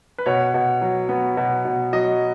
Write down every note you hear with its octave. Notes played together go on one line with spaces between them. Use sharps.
B4
B2 C#5
B2
F#3
B3
B2
B2
F#3 D#5